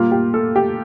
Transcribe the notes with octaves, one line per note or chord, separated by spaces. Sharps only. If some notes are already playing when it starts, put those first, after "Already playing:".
Already playing: A#2 G3 A#3 F4
G4
A4
G4